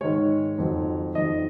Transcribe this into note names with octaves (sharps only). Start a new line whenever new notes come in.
G#2 D#3 G#3 C#5
F2 D#3 F#3
F2 D#3 F#3 D#5